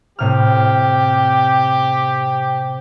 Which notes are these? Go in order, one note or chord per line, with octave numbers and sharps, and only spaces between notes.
A2 C3 G4 F6